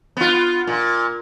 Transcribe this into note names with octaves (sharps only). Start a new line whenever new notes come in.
B3 F4
A#2